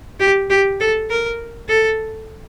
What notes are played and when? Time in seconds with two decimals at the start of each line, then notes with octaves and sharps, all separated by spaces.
0.20 G4
0.50 G4
0.80 A4
1.10 A#4
1.69 A4